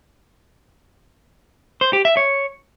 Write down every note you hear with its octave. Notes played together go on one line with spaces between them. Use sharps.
C5
G4
E5
C#5